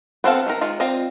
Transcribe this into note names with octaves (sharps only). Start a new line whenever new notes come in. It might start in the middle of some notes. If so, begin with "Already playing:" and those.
B3 C4 A4 F5
D#3 D#4 A#4
D#3 G#3 F4
C4 F4 D5 D#5